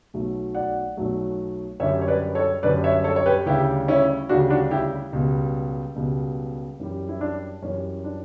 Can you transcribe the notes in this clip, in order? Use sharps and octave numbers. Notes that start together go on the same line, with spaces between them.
B1 B2 F#3 A3
D5 F#5
B1 B2 F#3 A3
F#2 D3 G3 C#5 E5
C#5
B4 D5
A4 C#5
F#2 D3 G3 B4 D5
C#5 E5
A4 C#5
C#5
G4 B4
D2 C#3 G3 E4 G4
C#4 E4
D2 C#3 G3 D4 F#4
D4 F#4
E4 G4
C#2 B2 G3
C#2 B2 G3
F#2 E3 G3
E4
D4
F#2 E3 G3 C#4
D4